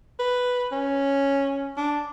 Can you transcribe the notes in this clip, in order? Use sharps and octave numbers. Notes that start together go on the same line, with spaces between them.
B4
C#4
D4